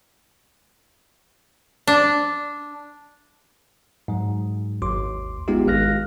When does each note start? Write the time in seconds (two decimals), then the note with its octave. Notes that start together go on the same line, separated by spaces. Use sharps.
1.87 D4
4.08 G#2 F#3
4.82 G#1 D#2 C6 D6
5.48 G#3 B3 D#4 F4 G4
5.67 G#1 G#3 F5 F6 F#6 A#6